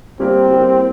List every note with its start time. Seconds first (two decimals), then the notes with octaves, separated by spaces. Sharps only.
0.19 G3 A#3 C4 E4 G4 A#4
0.51 G3 A#3 E4 G4 A#4